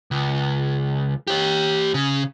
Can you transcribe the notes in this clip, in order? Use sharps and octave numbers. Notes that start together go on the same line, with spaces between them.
C#2
G4 C#5
C#3